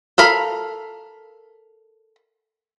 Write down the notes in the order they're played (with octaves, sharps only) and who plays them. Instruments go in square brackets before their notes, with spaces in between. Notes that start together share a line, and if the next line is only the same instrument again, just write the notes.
[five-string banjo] A4 A#4 F5 B5